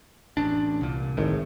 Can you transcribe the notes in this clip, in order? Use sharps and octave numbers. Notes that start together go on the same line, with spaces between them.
A1 D4
C2 A#2
G#1 A2